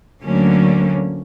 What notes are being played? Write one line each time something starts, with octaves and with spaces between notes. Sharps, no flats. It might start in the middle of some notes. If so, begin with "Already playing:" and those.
D2 D3 F#3 A#3 C#4